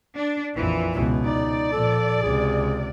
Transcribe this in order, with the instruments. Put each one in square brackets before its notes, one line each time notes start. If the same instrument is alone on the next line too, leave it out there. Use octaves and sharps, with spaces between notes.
[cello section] D4
[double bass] A#1 F2 [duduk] A#2 [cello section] E3
[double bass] C#2 B2
[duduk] D#4 [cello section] D5
[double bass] A#2 F3 [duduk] A4
[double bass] C#2 C3 [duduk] G#4